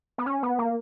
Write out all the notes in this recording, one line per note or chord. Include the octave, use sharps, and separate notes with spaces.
B3
C#4
B3
A#3